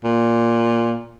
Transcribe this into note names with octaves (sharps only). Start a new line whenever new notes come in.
A#2